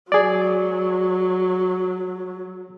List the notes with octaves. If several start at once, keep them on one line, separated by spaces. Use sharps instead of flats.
F#3 G#4 D5